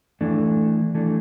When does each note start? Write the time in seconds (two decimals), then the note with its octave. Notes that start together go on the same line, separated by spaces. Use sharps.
0.21 E3 A3 D4
0.95 E3 A3 D4